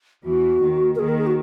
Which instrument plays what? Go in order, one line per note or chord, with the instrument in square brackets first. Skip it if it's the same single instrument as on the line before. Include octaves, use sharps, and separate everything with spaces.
[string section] E2 E3 [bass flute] F#4
[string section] D#2 D#3
[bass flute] A#4
[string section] D#2 D#3 [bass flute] G#4
[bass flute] A#4
G#4
F#4